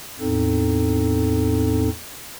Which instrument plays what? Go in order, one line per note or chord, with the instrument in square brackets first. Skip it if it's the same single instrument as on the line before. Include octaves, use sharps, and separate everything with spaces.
[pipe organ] E2 A2 C4 D#4 A4